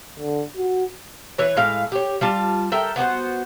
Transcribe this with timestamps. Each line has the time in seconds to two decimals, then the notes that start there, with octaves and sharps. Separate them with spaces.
0.19 D3
0.57 F#4
1.38 E3 B4 C#5
1.57 A2 G#3 F5
1.92 G4 C#5
2.21 G3 F4 A5
2.72 A4 A#4 E5 G5
2.96 B3 F#4 G4 C5